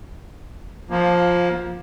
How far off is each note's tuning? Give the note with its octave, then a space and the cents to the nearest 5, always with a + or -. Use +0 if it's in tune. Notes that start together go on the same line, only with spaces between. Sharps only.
F3 +10 A#3 +20